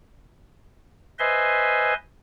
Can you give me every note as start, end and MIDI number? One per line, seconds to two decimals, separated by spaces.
1.19 1.94 71
1.19 1.94 72
1.19 1.94 75
1.19 1.94 76
1.19 1.94 80
1.19 1.94 84